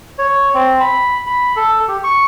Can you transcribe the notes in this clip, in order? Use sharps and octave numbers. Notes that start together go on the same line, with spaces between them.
C#5
C4
B5
B5
A4
G4
C#6